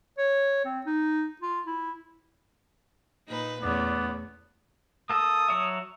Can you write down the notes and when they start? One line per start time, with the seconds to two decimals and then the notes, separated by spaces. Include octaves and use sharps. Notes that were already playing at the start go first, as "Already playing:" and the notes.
0.18 C#5
0.65 C4
0.86 D#4
1.41 F4
1.66 E4
3.28 A#2 D#4 B4
3.63 E2 A3 B3 C#4 D5
5.10 A#3 A4 D#6
5.48 F#3 C#5 E5